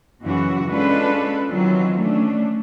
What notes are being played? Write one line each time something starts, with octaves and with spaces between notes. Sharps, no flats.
F#2 C#3 E3 F#3 F#4
G#3 C#4 D4 F4 A4 B4
D#3 E3 F#3 C4 F4
A3 C#4 D4